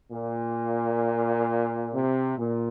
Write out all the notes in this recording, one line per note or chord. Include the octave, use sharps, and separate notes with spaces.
A#2
C3
A#2